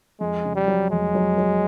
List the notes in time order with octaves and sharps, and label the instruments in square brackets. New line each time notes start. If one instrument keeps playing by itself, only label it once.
[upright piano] F2 [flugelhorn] G#3
[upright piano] C#3
[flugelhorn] G3
[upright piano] F#3
[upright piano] F1 [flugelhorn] G#3
[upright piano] F#3
F#3